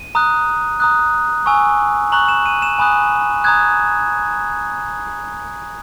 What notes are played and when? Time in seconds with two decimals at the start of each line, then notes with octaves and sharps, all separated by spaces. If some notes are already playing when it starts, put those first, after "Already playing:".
Already playing: D#7
0.15 A#5 D#6 F#6
0.80 A#5 D#6 F#6
1.46 G#5 C#6 E6
2.12 A#5 C#6 F#6 F#7
2.28 E7
2.46 D#7
2.62 E7
2.79 G#5 B5 D#6 F#6
3.44 A#5 D#6 F#6 G#6